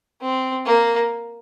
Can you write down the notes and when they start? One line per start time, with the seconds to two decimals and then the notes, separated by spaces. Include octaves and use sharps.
0.22 C4
0.66 A#3